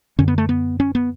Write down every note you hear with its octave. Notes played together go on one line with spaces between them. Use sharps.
F#2 D3 C#4
B3
A3
B3
C#4
B3